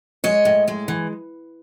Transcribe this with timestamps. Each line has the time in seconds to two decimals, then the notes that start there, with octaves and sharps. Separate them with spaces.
0.24 G#3 C#5 D#5
0.45 A2
0.68 G#3
0.88 E3